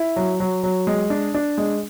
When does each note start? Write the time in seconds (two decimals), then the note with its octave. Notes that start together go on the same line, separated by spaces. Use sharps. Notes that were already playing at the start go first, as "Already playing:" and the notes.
Already playing: E4
0.16 F#3
0.40 F#3
0.63 F#3
0.87 G#3
1.10 D4
1.34 D4
1.58 G#3